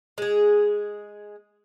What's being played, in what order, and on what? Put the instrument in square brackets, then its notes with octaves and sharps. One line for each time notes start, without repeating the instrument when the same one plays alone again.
[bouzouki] G#3 G#4